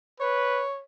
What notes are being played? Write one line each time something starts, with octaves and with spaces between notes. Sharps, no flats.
B4 C#5